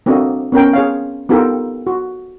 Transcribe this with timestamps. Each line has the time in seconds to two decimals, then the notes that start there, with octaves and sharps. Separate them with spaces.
0.06 A#3 C4 D4 F#4 A4 D#5
0.52 B3 C#4 A#4 G5
0.73 G#4 C#5 F5
1.29 B3 D#4 F4 G4 A4 A#4
1.87 F#4